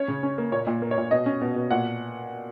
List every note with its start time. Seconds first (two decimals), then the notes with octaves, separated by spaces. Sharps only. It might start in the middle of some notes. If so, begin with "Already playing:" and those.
Already playing: C#4 C#5
0.08 C#3
0.23 C#4
0.38 A#3
0.52 A#2 C#5
0.67 A#2
0.82 A#3
0.91 C#5
0.97 A#2
1.11 B2 D#5
1.26 C#4
1.41 B2
1.56 B2
1.71 A#2 F#5